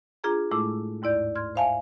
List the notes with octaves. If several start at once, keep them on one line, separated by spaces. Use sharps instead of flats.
D4 F4 G#4 A#5
A2 G#3 A3 E4 D6 E6
D#2 G#2 E4 D5 G6
C6 F6 G#6
C5 E5 F5 G#5 A5